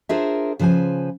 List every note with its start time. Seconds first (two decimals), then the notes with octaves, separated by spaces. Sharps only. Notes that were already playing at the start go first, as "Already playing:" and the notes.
0.09 D4 F4 G#4 A#4 C5 E5
0.59 C#3 F3 B4 C5 G#5